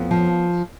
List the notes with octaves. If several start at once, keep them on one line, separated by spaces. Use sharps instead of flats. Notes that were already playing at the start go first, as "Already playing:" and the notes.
Already playing: F2 B3
F3